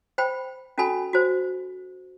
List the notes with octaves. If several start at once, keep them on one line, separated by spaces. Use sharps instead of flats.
C5 G5 B5
C#4 F#4 A4 G#5 B5
F#4 C5